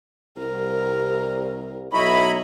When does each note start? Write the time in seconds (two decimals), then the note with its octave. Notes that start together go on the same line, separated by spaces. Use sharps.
0.37 C2 A#4
1.93 B1 E4 C#5 D#5 E5 A#5 B5